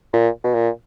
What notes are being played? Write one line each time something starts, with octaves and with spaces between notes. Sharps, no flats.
A#2
B2
A#2